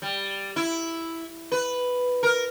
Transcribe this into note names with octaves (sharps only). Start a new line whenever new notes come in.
G3
E4
B4
A#4